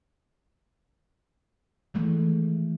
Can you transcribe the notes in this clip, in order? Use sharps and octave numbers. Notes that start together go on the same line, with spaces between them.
D#3 E3 G#3 A3